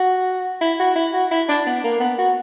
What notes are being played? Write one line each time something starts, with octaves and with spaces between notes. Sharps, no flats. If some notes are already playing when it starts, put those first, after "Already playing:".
Already playing: F#4
E4
F#4
E4
F#4
E4
D4
B3
A#3
B3
F#4